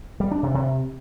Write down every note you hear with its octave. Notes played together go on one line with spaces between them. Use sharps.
G3
D4
C3
C3